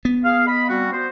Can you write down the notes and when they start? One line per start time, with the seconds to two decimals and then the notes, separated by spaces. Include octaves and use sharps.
0.05 B3
0.24 G#4 F5
0.47 D#5 B5
0.68 G3 C4 F#4
0.92 B3 C5